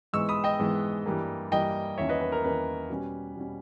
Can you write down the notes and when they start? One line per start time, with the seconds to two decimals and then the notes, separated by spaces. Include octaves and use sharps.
0.13 G#2 E3 G#3 B3 C#6 E6
0.29 B5 D#6
0.44 D#5 G5
0.59 G#2 E3 G#3 B3
1.06 G2 E3 G3 A#3
1.51 G2 E3 G3 A#3 D#5 G5
1.98 E2 D#3 A#3 C#4 C#5 E5
2.09 B4 D#5
2.21 B4
2.32 A#4
2.44 E2 D#3 A#3 C#4 B4
2.89 B2 G3 C#4
3.35 B2 G3 C#4